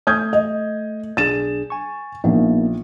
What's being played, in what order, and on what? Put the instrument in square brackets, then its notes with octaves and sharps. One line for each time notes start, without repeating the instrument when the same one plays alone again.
[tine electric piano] A3 [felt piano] D#6 G6 G#6
[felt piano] D#5
[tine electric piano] B1 D4 G#4 [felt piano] A6 E7
[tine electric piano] G#5 C#6
[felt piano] A#1 [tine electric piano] A#3 B3 D#4